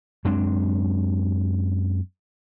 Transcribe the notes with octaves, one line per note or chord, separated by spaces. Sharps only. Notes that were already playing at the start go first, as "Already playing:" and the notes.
F#2 G#3 C4 D4